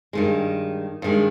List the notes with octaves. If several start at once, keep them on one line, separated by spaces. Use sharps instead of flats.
G2 D#3 G#3
G2 D#3 G#3